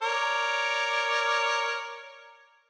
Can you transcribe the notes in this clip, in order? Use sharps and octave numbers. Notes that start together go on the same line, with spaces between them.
A#4 C#5 D5